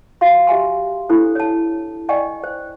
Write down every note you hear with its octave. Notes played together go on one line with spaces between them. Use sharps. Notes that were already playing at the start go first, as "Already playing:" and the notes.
F#4 F5 C6
G4 E5 G#5 C6
D4 E4 A4 C5
C#5 A5
D5 D#5 G5 G#5 C#6
C5